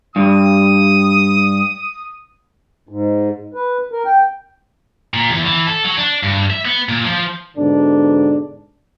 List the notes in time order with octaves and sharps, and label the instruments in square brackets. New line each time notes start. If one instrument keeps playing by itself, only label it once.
[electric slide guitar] G2 [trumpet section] D#6
[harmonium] G#2
B4
A#4
G5
[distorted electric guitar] A#2
E2
E3
A4
F#3
D4
G2
E5
B3
A#2
F3
[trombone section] G#2 B2 D3 D4